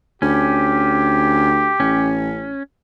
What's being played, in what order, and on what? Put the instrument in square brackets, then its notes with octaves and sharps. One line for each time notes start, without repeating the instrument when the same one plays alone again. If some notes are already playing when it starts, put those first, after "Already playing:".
[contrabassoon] D2 [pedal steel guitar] C#4 [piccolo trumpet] G4
[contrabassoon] A1 [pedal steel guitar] C#4